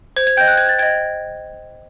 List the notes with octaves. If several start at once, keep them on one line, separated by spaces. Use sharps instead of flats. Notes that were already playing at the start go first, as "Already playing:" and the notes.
C5 G#6
G#6
D#5 G5 G6
F#6
C5 G#6
A6
D#5 G5 G#6